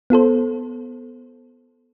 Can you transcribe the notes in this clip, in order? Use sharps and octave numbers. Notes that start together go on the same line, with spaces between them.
B3 F4 A4 C5